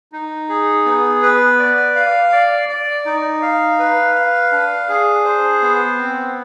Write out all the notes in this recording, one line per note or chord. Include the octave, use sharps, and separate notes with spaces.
D#4
G#4
B3
B4
D5
F5
D5
D5
D#4
F5
B4
F5
D4
G#4
C5
B3
C4